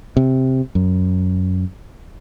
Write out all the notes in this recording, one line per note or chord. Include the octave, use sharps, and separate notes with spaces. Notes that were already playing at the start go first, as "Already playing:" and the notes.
C3
F#2